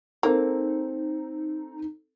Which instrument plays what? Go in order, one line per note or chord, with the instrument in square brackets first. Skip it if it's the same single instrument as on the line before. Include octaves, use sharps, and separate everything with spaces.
[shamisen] A#3 [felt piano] C4 A4 [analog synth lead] D#4